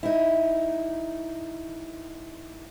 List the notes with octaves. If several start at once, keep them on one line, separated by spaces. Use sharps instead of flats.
D#4 E4